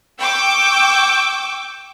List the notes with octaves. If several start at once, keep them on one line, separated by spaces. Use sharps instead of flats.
G5 C#6 D6 E6 G6